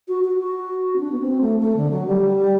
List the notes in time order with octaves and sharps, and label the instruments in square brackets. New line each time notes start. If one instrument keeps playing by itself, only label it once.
[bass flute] F#4
F#4
F#4
C4
D4
B3
C4
A3
A3
D3
F#3
G3